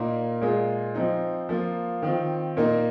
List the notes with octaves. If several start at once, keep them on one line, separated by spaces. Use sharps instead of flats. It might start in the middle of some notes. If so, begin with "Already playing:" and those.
Already playing: A#2 A#3 D#4
A#2 G#3 F4
F3 C4 D#4
F3 A#3 F4
D#3 C4 F4
A#2 A#3 D#4